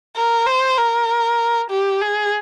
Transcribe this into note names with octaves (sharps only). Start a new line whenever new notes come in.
A#4
C5
A#4
G4
G#4